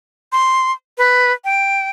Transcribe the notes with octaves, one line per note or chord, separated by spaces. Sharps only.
C6
B4
G5